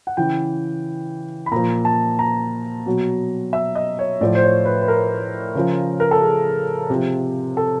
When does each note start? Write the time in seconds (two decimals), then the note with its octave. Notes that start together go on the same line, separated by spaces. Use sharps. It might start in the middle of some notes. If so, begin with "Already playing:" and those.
0.07 F#5
0.17 C#3 E3 G5
1.46 B5
1.52 A#2 F3 A#5
1.85 A5
2.19 A#5
2.86 B2 F#3
3.53 E5
3.75 D#5
3.99 C#5
4.21 A2 F3 D5
4.35 C5
4.43 C#5
4.65 B4
4.81 B4
4.88 A#4
5.55 C#3 F3
6.00 A#4
6.11 A4
6.22 G#4
6.90 C3 F3
7.57 A4